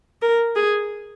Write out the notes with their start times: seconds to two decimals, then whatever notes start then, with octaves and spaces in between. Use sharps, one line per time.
0.22 A#4
0.56 G#4